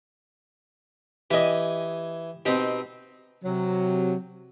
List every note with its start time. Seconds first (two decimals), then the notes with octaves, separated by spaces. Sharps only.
1.31 E3 G4 D#5 G#5
2.46 B2 C4 D#4 G4
3.44 C3 F#3